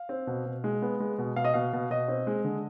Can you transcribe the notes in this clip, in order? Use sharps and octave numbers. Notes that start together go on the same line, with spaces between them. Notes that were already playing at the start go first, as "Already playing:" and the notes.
Already playing: F5
C4
B2
B2
G#3
B3
G#3
B2
B2 F5
D#5
B2 F5
B2
B2 D#5
C4
G#3
D3